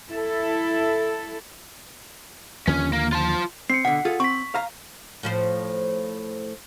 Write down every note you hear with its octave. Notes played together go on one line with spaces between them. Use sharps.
E4 A4
D#2 D3 F3 C#4
A#3
F4 A5
C4 C7 C#7
B2 D3 F#5
F4 G#4 A4
C4 C#6 B6
F5 A#5
A2 F3 C5